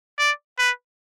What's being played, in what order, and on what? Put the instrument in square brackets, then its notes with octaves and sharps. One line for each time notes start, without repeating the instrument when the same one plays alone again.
[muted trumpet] D5
B4